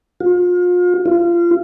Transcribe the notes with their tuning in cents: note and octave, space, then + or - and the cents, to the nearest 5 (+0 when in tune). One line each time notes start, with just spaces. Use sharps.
F4 +35
F4 -25